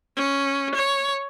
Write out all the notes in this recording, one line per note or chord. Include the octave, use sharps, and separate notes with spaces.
C#4
C#5